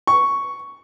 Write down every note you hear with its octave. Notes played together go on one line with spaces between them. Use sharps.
C#6